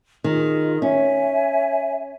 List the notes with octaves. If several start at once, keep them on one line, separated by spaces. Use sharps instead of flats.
D#3 F4 G#4 D#5
C#4 C#5 E5 G#5